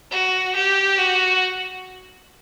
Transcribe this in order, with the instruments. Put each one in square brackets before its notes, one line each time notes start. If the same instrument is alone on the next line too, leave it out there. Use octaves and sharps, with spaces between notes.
[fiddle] F#4
G4
F#4